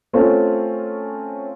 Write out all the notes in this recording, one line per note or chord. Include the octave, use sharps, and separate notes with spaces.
A3 C4 C#4 F4 A4